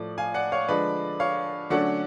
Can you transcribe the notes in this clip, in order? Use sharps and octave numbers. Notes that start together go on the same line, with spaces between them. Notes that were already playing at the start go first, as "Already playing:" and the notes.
Already playing: A2 F3 A3 D5
F5 G#5
D5 F#5
C#5 F5
D3 F3 G#3 B4 D5
C#5 F5
D3 F#3 A3 C#4 D5 F#5